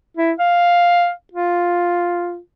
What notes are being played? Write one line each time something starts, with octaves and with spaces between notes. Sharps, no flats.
E4
F5
F4